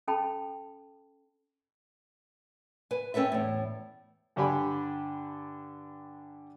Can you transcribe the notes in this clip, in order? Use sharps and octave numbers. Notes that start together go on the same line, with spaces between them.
C#4 A4 G5 A5 B5
B4 G#5
C4 C#4 A4 B4 E5
E2 A2
G2 D3 D4 G4 G#5 B5